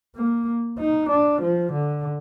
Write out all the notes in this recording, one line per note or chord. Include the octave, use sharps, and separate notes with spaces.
A#3
D#4
D4
F3
D3